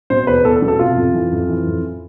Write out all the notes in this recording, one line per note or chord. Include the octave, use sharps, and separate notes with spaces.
B2 C5
E2 B4
E2 A4
A4
B2
A4
C3 F4
F2
E3
F2
E3
F2